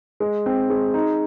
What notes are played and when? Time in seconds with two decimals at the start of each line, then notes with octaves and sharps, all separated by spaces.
0.20 G#3
0.46 C4
0.70 G#3
0.94 D#4